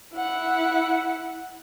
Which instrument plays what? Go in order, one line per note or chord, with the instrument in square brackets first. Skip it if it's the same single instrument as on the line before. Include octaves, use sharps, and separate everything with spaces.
[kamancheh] E4 F#5